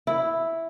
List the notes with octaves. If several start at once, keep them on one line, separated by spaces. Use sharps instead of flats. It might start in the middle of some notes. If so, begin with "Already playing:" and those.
E4